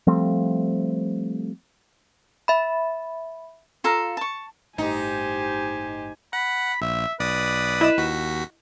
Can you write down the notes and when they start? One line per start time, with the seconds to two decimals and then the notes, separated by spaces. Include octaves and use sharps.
0.07 F3 G3 A3 C4
2.48 E5 B5
3.84 F4 A4 F5 A#5
4.17 A5 C#6
4.78 G1 A2 D#4 G4 C5 G#5
6.33 F#5 B5
6.82 A#1 E5
7.20 B1 B4 D5 D#6
7.81 E4 D#5 E7
7.97 D#2 F#4 B6